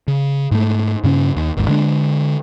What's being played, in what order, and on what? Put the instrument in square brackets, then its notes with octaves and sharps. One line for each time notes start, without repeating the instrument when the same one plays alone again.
[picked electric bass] C#3
G#2 A3
G2 C#3 C#4
D#2
G#1 D#2 G#2
D3 G#3 D4